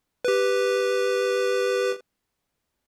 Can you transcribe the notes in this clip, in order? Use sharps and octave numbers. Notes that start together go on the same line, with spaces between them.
G4 B4